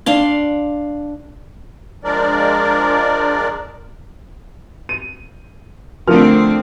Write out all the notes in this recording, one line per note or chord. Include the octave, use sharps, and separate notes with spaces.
D4 F5 C6
F3 G#3 D4 A#4 D5
D#7
D3 F3 A3 C4 A#4 F6